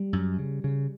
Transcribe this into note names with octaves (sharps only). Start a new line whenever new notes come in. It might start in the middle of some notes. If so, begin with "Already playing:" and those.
Already playing: G3
F#2
C#3
C#3